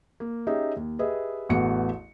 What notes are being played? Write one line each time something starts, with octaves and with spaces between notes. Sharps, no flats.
A#3
C#4 D#4 G4 G#4 E5
D#2
G4 G#4 B4 D#5 E5
A1 E2 A3 B3 F#4 C#7